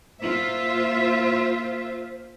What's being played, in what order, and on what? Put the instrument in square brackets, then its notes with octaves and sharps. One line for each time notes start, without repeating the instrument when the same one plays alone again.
[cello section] A#3 F4 E5 [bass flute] C5